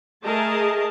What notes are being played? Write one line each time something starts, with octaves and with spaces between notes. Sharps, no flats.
A3 G#4 A#4 D#5 A5